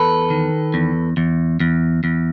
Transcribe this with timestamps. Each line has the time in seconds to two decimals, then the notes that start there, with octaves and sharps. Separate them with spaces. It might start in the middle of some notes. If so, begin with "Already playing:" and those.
Already playing: E2 A4 B4
0.30 D#3
0.74 E2
1.17 E2
1.60 E2
2.04 E2